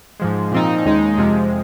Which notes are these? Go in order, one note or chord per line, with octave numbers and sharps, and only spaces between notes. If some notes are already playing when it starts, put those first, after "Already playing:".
G#2 F3 G#3
A#2 F3 C4 D#4
D#2 C#3 G#3 D#4
F2 C3 F3 G#3